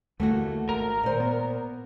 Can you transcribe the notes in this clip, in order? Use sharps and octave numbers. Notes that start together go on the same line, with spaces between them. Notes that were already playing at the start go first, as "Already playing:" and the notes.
D#2 D3 E3 A3 A#3 F#4
G#1 A#4
A#2 C5
B3